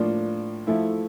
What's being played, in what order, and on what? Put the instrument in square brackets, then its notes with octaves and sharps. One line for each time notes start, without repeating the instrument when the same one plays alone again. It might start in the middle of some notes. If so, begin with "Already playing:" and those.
Already playing: [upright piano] A2 F3 A#3 D4 F4
F3 A3 E4